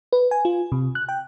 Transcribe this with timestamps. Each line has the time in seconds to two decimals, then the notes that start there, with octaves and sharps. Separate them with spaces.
0.13 B4
0.31 G#5
0.45 F4
0.72 C3
0.95 F#6
1.09 G5